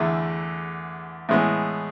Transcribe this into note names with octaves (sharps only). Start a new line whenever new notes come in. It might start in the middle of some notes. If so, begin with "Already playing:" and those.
Already playing: E2 D3 A3 E4 G#4
A2 E3 G#3 B3